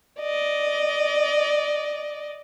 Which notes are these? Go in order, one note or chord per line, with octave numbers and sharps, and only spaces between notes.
D5 D#5